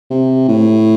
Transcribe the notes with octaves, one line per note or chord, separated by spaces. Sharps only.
C3
A2